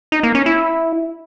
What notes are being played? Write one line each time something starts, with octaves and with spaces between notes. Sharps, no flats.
D#4
A#3
C#4
E4